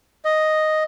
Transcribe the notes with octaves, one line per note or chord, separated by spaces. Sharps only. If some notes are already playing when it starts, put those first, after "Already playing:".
D#5